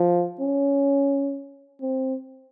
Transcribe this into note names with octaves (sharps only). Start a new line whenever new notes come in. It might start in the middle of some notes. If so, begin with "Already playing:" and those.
Already playing: F3
C#4
C4